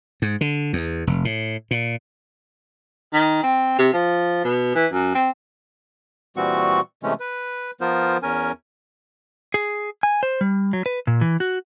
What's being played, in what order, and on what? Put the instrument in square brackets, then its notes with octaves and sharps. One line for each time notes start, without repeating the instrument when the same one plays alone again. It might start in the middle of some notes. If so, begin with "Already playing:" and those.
[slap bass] G#2
D3
E2
F1
A2
A#2
[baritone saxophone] D#3
C4
C3
F3
B2
E3
F#2
C4
[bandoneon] A#2 E3 G3 C4 F#4 C#6
C3 E3 G#3 A3 C#4
B4
F3 B3 F4 A#4 C5
E2 C#4 A#4 G#5
[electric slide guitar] G#4
G#5
C5
G3
F#3
B4
A#2
E3
F#4